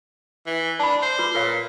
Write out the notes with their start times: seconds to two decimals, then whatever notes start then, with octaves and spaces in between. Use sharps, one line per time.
0.47 E3
0.80 D4 A5 B5
1.02 C5
1.18 F4 B4 D6
1.35 A#2 A#4 C#5 F5